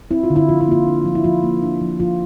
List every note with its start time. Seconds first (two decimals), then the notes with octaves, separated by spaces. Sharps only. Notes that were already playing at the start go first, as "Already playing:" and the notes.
0.11 C4 E4
0.24 F4
0.30 D3
0.36 E4
0.49 F3 F4
0.61 E4
0.68 A#3 F4
0.87 D4
1.05 F3
1.15 E4
1.24 F3 F4
1.43 A#3
1.63 D4
1.81 F3
2.00 F3 F4